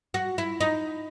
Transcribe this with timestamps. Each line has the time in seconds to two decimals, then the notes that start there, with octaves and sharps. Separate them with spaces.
0.14 F#4
0.38 E4
0.61 D#4